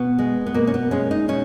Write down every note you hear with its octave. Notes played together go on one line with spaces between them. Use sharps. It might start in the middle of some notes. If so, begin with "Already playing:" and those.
Already playing: B2 B3
G#3
B3
B2 A#3
C#4
B3
G#3 C#4
D#4
B2 C#4